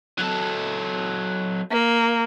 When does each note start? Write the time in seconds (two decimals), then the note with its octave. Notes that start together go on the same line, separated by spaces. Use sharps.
0.19 F#3 A4
1.71 A#3